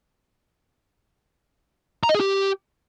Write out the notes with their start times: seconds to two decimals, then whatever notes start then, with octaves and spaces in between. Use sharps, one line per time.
2.03 A#5
2.09 D#5
2.15 G#4
2.20 G4